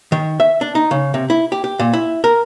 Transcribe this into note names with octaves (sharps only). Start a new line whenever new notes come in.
D#3
E5
D4
D#4
C#3
C3
E4
G4
G4
A#2
E4
A#4